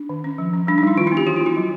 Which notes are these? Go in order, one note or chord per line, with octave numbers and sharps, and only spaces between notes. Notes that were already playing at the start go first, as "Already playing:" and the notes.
Already playing: D4
D#3
C#4
F3
C#4
G3 D4
D#4
G3 E4
D#3 F4
E4
B3
G4
E3 F#4
F4
B3 E4
F#3